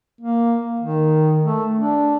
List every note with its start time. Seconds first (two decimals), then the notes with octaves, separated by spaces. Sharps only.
0.21 A#3
0.80 D#3
1.43 A3
1.78 D4